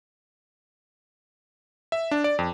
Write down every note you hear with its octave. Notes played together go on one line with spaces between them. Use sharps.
E5
D4
D5
F2